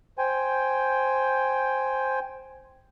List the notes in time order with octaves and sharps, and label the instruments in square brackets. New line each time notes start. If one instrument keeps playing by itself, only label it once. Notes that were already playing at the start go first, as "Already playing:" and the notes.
[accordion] C5 G5 G#5